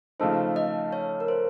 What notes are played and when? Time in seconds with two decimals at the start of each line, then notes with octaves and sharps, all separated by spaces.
0.19 C#3 F3 A3 D#4 C5
0.56 D#5
0.93 C#5
1.20 A#4
1.28 C5